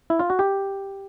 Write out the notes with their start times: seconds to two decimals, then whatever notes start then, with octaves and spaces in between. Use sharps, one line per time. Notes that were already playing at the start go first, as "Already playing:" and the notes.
0.10 E4
0.20 F4
0.30 F#4
0.39 G4